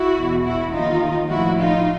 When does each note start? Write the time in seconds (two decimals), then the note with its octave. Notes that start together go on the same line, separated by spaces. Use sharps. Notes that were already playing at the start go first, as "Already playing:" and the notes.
Already playing: E4 F#4
0.15 E2 B2
0.44 E4 F#4
0.72 D#2 D#3 D#4 F4
1.29 A2 F3 E4 F#4
1.58 D#4 F4